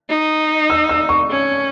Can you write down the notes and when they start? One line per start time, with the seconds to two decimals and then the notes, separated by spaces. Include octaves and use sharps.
0.09 D#4
0.70 E6
0.89 E6
1.09 C#6
1.30 C#4